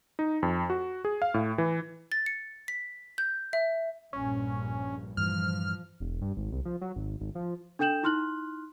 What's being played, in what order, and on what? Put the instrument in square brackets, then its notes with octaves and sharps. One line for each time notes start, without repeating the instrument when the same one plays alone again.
[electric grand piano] D#4
F2
F#4
G#4
F5
A2
E3
[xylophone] A6
C#7
B6
G6
E5
[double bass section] A#1 G2 [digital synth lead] C#4
[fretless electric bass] G2 E3 [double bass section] F3 [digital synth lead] F6
[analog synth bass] E1
G2
G#1
C2
F3
F#3
G#1
G#1
F3
[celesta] D4 A4 G5 G6 E7 F#7
D#4 E4 C6 F6 F#6 F#7